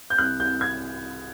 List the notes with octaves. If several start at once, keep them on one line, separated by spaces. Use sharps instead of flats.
G6
C2 F#6
C2 G6
G#6